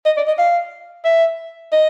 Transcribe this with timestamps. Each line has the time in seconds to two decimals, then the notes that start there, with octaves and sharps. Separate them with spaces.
0.06 D#5
0.17 D5
0.27 D#5
0.38 F5
1.05 E5
1.72 D#5